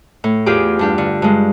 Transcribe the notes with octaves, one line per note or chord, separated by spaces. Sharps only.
A2
E2 F4 G4 G#4 D6
G2 D4 G4
D3
G2 G#3